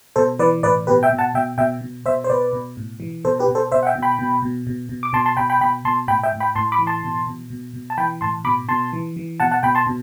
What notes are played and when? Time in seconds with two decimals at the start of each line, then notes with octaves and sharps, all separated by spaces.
0.16 B2 A4 C5
0.39 E3 B4 D5
0.63 A2 B4 D5
0.87 B2 G4 B4
1.03 E5 G5
1.10 B2
1.19 F#5 A5
1.34 B2 E5 G5
1.58 B2 E5 G5
1.81 B2
2.05 B2 C5 E5
2.24 C5
2.30 B2 B4 D5
2.53 B2
2.77 A2
3.00 E3
3.25 B2 A4 C5
3.40 G4 B4
3.48 B2
3.55 A4 C5
3.72 B2 C5 E5
3.83 F#5
3.87 E5 G5
3.95 B2
4.02 G5 B5
4.19 B2
4.42 B2
4.67 B2
4.89 B2
5.03 D6
5.13 B2 A5 C6
5.26 A5 C6
5.37 B2 G5 B5
5.50 G5 B5
5.61 B2 G5 B5
5.85 B2 A5 C6
6.08 A2 G5 B5
6.23 E5 G5
6.33 A2
6.40 G5 B5
6.55 A2 A5 C6
6.72 B5 D6
6.79 E3
6.87 A5 C6
7.04 B2
7.27 B2
7.50 B2
7.73 B2
7.90 A5
7.98 E3 G5 B5
8.21 A2 A5 C6
8.45 B2 B5 D6
8.69 B2 A5 C6
8.93 E3
9.17 E3
9.40 B2 F#5 A5
9.52 F#5 A5
9.63 B2 G5 B5
9.75 A5 C6
9.87 B2